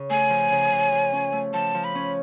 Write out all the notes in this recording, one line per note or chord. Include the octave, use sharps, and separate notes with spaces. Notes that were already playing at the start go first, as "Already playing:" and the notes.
Already playing: C#3
A3 G#5
F3
C#3
C#3
F3
C#4
A3
F3 A5
F3
B5
C#4